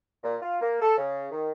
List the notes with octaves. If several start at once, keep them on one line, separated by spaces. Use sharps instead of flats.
A#2
F4
A#3
A4
C#3
D#3